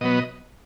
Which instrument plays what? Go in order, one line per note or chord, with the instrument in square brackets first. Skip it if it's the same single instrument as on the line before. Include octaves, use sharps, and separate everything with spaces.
[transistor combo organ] B2 F#3 B3 D#5